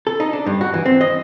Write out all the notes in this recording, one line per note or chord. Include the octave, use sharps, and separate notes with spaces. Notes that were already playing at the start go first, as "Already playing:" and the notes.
A4
D#4
D4
G2
F#4
E3
C4
D#5